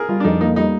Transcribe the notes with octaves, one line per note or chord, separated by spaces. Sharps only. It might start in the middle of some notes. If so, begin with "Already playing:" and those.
Already playing: G#4 A#4
G3 F4
D4
F2 D#4
A#3 D#4
G3 D#4